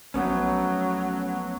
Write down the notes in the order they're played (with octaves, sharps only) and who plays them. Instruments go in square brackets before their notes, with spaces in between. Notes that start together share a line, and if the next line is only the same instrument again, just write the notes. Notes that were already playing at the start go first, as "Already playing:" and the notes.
[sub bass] A#1 [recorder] F#3 [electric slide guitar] A3 B3 C#4